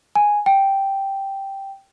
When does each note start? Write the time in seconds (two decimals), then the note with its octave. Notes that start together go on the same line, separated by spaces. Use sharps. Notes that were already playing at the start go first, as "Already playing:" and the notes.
0.15 G#5
0.46 G5